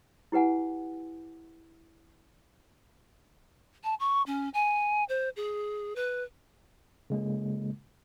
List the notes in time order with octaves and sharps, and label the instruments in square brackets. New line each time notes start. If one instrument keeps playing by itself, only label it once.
[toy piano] E4 G4 B4 F#5 G#5
[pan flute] A5
C#6
C#4
G#5
C5
G#4
B4
[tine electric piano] C#3 G#3 A#3